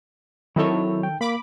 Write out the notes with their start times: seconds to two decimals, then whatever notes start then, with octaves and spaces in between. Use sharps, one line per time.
0.56 D#3 F#3 C4 E4 A4 C#5
1.03 G5
1.21 A#3 B5 D6